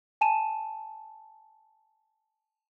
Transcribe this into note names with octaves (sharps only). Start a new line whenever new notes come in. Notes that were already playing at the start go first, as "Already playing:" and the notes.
G#5 A5 D#7 E7